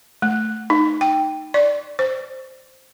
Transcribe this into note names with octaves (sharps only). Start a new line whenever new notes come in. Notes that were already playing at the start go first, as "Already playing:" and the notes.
A3
D#4
G5
D5
C5